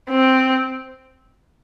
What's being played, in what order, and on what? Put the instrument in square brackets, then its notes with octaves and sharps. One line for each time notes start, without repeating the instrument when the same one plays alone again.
[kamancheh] C4